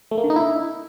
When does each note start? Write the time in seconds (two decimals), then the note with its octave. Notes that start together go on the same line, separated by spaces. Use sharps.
0.11 A3
0.18 A#3
0.24 D3
0.30 D#4
0.36 E4